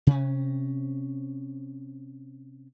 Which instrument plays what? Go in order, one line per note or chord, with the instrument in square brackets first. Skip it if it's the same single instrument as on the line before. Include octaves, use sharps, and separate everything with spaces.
[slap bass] C3 C#4